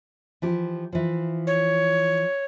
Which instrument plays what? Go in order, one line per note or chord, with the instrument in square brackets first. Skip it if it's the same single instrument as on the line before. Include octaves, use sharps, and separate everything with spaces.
[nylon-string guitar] E3 F3 G4
E3 F3
[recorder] C#5